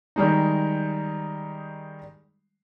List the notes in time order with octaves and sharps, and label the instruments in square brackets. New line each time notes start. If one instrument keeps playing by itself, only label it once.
[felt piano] D#3 G3 G#3 D#4